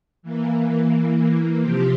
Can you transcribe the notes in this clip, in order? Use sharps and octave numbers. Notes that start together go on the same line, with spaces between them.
E3 A#3
C3 F3 C4 G4